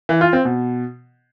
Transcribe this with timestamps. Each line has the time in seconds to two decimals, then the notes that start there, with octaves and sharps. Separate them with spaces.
0.09 E3
0.21 F4
0.33 C4
0.45 B2